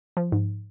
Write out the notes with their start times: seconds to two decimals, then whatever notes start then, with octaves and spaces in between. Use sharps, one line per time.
0.17 F3
0.32 G#2